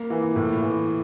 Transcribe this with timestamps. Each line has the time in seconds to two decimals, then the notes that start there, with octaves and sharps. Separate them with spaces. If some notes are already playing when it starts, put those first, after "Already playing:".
Already playing: A#3
0.10 E3
0.36 A2
0.62 E3